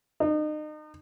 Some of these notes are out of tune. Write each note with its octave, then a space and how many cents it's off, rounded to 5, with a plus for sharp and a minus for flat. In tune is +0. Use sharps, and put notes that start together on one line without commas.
D#4 -35